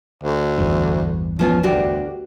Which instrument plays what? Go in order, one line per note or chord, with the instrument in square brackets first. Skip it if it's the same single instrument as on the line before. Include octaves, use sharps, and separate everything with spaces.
[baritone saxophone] D2
[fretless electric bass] A1 E2 G2
[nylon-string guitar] F3 B3 F4 [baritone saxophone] C#4
[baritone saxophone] D2 [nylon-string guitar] D4 F#4 G4